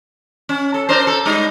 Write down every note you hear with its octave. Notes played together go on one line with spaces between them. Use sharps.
C#4
A4
D4 A#4 C5
A4
G3 G#3 D#4